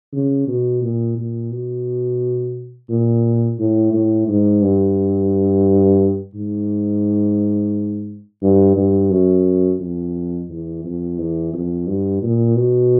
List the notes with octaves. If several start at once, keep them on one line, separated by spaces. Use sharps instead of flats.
C#3
B2
A#2
A#2
B2
A#2
A2
A2
G#2
G2
G#2
G2
G2
F#2
F2
E2
F2
E2
F2
G2
A#2
B2